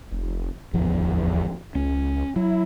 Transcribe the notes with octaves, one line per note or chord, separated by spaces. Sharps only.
F1
D1 G#1 E2 F3
C#2 C#4
F#3 E4